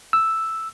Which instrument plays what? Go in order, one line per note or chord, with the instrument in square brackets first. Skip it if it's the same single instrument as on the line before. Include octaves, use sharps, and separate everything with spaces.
[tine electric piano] E6